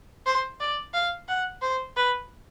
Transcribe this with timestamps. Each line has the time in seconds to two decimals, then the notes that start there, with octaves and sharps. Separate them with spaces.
0.26 C5
0.60 D5
0.94 F5
1.28 F#5
1.62 C5
1.96 B4